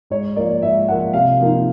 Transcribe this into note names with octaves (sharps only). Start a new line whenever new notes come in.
G#2 C#5
F3 A#3 D5
G#2 E5
F3 A#3 F#5
C3 F5
F3 A#3 D#4